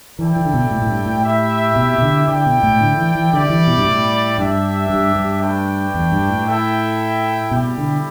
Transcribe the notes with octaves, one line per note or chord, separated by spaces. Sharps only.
E3 E4 A4 D5 G5
E3
D3
B2
A2
A2
G2
A2
E4 G4 E5
B2
B2
D3
D3 E4 A4 D5 G5
B2
A2
D3
E3
E3
D3 G3 E4 G4 D5
E3
B2
G2
A2
G2 D4 G4 E5
G2
G2
A3 D4 B4 D5 G5
E2
G2
A2
E4 A4 E5 G5
B2 G3 E4 G4
D3